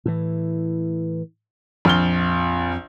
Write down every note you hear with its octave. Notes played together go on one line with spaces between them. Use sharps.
A2 E3
A#1 F2 F6 G7